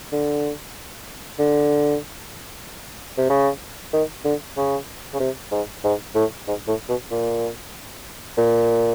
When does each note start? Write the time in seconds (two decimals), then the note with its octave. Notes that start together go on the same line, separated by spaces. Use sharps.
0.12 D3
1.39 D3
3.18 C3
3.30 C#3
3.93 D#3
4.25 D3
4.57 C#3
5.14 C#3
5.20 C3
5.52 G#2
5.84 G#2
6.15 A2
6.48 G#2
6.68 A2
6.89 B2
7.11 A#2
8.37 A#2